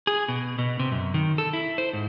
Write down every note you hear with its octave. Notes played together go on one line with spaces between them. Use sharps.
G#4
B2
B2
C3
F#2
D#3
A4
E4
C5
G#2